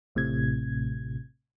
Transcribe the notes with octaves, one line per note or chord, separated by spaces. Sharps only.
A1 A2 C3 G#6